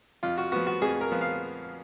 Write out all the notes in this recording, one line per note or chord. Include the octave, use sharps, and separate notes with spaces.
F2 F4
F#4
F3 B3 F#4
F#4
F2 G#4
A#4
F3 B3
F5